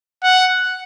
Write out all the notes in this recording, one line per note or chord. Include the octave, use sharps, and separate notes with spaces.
F#5